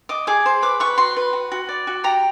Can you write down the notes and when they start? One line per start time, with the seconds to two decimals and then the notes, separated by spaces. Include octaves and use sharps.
0.09 D#5 D6
0.27 G#4 D6
0.46 C5
0.62 B4 D6
0.80 B4 C#6
0.98 F#4 C6
1.16 B4
1.33 F#4
1.52 F#4
1.69 D5
1.87 F#4
2.04 G4 A#5